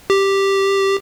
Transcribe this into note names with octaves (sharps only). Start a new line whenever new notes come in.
G4